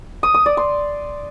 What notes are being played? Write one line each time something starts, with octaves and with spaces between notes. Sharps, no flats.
D#6
D#6
D5
C6